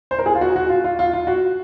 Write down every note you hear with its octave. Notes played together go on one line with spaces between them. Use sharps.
C5
A#4
G#4
F4
F#4
F#4
F4
F4
F4
F4
F#4